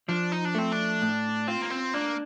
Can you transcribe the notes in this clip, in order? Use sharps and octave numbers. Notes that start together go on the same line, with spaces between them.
F3 D4
D#4
D4
A3 C4
D4
A2
C4 F4
A#3
C4
A#3 D4